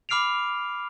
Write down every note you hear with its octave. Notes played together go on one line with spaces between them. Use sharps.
B5 D6 F6 C7 D7 F7